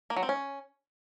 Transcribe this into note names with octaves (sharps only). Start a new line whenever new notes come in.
A#3
F#3
C4
C#4